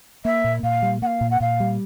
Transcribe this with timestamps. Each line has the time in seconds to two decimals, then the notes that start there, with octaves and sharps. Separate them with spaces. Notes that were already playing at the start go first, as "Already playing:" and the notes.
0.25 A#3 E5
0.44 A#2
0.63 A#2 F5
0.82 G3
1.02 A#3 F#5
1.06 F5
1.21 A#2
1.30 F#5
1.40 A#2 F5
1.60 G3